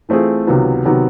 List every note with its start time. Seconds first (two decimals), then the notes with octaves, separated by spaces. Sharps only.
0.09 E3 A3 C4 F4 G#4
0.47 C#2 C3 D#3 F#3 B3
0.85 C3 D#3 F#3 B3